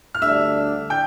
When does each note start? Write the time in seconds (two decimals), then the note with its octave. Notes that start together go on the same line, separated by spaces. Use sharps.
0.15 F6
0.22 D2 D3 G3 D4 E5 E6
0.90 G5 G6